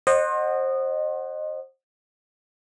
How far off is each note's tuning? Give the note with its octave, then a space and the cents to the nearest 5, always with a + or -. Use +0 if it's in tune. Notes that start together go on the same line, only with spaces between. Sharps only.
C5 +25 D#5 -20 F#5 +5